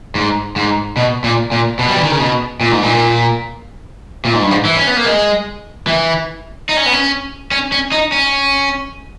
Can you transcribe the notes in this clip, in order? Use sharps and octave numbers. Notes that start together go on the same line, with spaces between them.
G#2
G#2
B2
A#2
A#2
B2
G3
E3
D#3
C#3
B2
A#2
G#2
A#2
A#2
G#2
G2
G#2
E3
C#4
B3
A#3
G#3
E3
D#4
C#4
B3
C#4
C#4
C#4
D#4
C#4